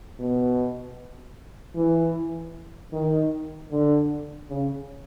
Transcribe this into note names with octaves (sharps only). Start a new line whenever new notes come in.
B2
E3
D#3
D3
C#3